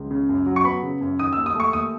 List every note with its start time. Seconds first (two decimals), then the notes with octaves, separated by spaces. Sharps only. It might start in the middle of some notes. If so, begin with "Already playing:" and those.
Already playing: C#2
0.11 C#3
0.29 F#2
0.46 F#3
0.56 C#6
0.64 B3 B5
0.83 C#3
1.01 F#2
1.19 D#3 D#6
1.33 D#2 E6
1.46 D#6
1.55 A3 C#6
1.73 D#2 D#6